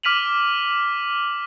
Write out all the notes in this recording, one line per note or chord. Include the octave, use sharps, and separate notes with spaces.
D6 F6 B6 D#7 F7 F#7